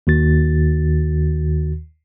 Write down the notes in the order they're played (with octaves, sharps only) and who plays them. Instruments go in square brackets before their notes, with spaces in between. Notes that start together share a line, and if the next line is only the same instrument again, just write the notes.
[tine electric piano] D#2 D#3 F#4 A6